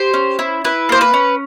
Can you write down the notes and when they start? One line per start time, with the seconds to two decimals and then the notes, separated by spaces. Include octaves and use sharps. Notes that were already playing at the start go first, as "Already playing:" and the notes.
Already playing: G4 C5
0.14 C#4
0.39 E4
0.65 E4 B4
0.89 A#3 C5
1.01 B4
1.14 C#4